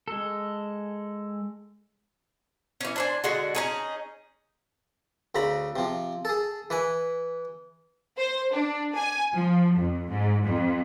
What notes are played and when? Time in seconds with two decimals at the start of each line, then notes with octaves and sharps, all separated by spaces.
0.08 G#3 A4
2.81 E3 C#4
2.96 D4 C5 G#5
3.24 D3 G#3 F#4
3.55 C#4 D#4 G#4
5.35 D2 C#3 A#5 B5
5.76 C3 F3
6.25 G#4 A4
6.70 E3 B4 G#5
8.17 C5
8.53 D4
8.95 G#5
9.34 F3
9.77 F2
10.10 G#2
10.45 F2